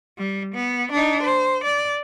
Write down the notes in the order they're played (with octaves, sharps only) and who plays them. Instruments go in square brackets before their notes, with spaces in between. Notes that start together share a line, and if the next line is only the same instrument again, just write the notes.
[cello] G3
B3
D4 D#4
C5
D5